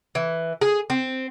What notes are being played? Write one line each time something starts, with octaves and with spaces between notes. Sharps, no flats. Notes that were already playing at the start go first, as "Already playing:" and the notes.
E3
G#4
C4